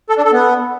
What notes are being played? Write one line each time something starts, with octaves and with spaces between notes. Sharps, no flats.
A4
D4
A4
B3